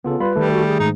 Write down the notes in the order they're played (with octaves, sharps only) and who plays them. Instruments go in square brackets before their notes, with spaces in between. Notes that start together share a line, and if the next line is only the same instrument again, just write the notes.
[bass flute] C#3 [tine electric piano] B3 F4 A4
[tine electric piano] G3 F4 B5 [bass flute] B4
[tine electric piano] D#3 A3 [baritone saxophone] G3 [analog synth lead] A4
[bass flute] F#4
G#4
[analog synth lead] G#2 [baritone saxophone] D#4